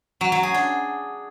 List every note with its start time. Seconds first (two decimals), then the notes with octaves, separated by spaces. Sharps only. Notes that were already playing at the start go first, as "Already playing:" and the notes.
0.21 F#3
0.32 F#3
0.43 G#4
0.54 D4